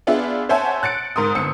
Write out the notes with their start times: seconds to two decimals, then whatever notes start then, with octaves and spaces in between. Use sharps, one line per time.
0.07 B3 D4 F4 G#4 E5
0.49 C5 C#5 E5 F#5 G#5 A5
0.83 F#6 A6 C#7 D7
1.16 G#2 A#4 C6 D#6
1.35 G1 C4 E6 C#7